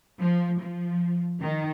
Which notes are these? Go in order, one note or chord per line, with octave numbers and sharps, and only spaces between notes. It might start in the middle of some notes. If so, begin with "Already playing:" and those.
F3
F3
D#3